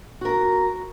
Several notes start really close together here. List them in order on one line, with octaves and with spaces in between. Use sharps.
F#4 A#4 A#5